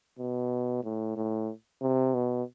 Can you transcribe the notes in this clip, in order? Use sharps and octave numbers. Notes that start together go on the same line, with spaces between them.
B2
A2
A2
C3
B2